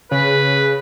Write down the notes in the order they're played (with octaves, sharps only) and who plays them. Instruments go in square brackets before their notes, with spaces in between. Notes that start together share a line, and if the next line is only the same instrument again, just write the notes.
[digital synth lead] C#3 [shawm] B4